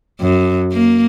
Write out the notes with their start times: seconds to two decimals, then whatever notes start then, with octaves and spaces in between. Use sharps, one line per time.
0.21 F#2
0.72 A#3